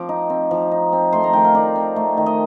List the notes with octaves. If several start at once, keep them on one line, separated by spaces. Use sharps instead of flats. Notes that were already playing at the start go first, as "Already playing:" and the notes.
Already playing: F3 C4 D6
D#4
C4
F3
D#4
C4
A3 C6
A#5
D#3 G5
F5
D#4 D5
C4
A3
D#3
D#5